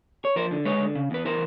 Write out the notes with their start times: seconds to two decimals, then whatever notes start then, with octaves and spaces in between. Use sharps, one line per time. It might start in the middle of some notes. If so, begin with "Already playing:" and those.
0.25 C#5
0.36 F3 A#4 C5
0.51 D3
0.65 G#3 B4 C#5
0.81 D3
0.95 C#3
1.11 E2 B4
1.25 E3 A#4 C5